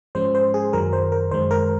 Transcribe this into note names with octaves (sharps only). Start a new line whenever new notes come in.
G#2 F3 G#3 C#4 C5
C5
G#4
F#2 D#3 F#3 A#4
C5
A#4
F#2 D#3 G#3 C5
A#4